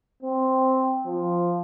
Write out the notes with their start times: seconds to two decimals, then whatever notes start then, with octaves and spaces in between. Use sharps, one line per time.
0.22 C4
1.06 F3